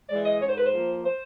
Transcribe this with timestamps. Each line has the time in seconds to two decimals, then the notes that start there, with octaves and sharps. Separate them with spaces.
0.08 E3 G#3 D5
0.24 D#5
0.40 G#2 C#5
0.48 C5
0.56 B4
0.64 C5
0.72 F3 A#3
1.04 C5